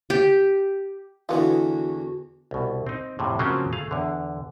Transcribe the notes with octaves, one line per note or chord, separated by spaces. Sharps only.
G4
E2 D3 E3 B3 F4 F#4
C2 B2
C4 D#4
F2 A2 C3
C#3 F3 F#3 A#3 C4 C#4
A3 G#4 F5
E2 D3